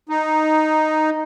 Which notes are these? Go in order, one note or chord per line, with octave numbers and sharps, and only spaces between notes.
D#4